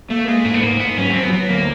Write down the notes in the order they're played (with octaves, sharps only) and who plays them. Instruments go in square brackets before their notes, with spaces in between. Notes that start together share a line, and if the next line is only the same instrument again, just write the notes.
[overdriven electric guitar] A3 [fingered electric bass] A#3
[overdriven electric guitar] G#3 [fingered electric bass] A#3
[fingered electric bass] G#2 [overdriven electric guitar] A3
[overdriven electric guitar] B3
[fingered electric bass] G#2 [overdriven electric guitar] A#3
[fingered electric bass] G#2 [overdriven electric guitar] B3
[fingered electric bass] F#3 [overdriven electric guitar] C#4
[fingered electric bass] F#3 [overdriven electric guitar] C4
[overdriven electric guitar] B3
[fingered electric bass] F#3
[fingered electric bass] D2 [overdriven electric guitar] A#3